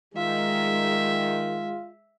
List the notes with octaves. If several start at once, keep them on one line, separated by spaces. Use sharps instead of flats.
D#3 G#3 F4 E5